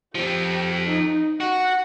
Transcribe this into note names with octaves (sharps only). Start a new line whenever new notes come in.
F3 C4 G4
D#4
F#4 F#5